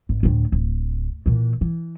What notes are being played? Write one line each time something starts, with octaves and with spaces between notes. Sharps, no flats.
G#1
D2 A2
D1
A#2 E3
E3